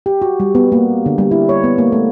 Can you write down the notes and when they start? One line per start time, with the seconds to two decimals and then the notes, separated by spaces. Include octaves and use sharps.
0.06 G4
0.22 F#4
0.40 G3
0.55 B3
0.72 A#3
1.06 D3
1.18 G3
1.31 E4
1.49 C#5
1.64 B3
1.78 A#3
1.92 A3